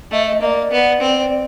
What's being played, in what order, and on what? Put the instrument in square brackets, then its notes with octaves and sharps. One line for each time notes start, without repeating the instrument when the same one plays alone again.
[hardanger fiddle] A3 [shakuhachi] D#5
[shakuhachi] D#5
[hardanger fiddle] A#3 [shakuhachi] D#5
[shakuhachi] D5
[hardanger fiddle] B3
C4